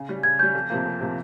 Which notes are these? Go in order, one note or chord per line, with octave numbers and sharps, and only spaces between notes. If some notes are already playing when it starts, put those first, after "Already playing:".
Already playing: C#3
G3 C#4
C#3 G#6
G3 C#4 G6
F2
C3 F3 A#3
F2
C3 F3 A#3